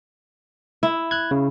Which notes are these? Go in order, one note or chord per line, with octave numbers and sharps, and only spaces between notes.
E4
F#6 G#6
C#3